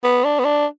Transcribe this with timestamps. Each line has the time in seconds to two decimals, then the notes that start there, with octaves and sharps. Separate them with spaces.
0.04 B3
0.24 D4
0.39 B3
0.45 D4